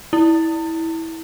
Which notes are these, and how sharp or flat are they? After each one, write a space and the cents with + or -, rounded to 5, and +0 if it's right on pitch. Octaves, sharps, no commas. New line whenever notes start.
E4 -20